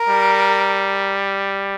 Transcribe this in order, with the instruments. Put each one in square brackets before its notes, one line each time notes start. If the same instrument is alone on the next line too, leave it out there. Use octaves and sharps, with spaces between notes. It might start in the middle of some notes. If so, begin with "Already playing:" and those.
Already playing: [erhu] A#4
[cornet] G3